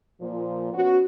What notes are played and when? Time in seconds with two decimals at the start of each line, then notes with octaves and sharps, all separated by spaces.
0.21 A#2 F3
0.74 B3 C#4 F#4